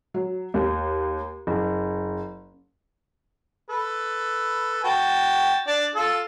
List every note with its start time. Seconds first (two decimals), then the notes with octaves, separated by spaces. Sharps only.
0.14 F#3
0.54 D#2
1.47 F#1
3.70 A4 B4
4.84 F#4 G5 A5
5.67 D4 D5 A5
5.96 F4 A4